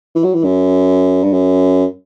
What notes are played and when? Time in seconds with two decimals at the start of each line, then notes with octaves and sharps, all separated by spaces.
0.15 E3
0.24 F#3
0.34 E3
0.44 F#2
1.24 G2
1.33 F#2